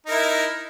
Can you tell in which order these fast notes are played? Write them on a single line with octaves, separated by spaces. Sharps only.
D#4 A#4 E4